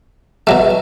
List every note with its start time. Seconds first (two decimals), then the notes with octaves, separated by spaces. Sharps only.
0.47 B2 F#3 A3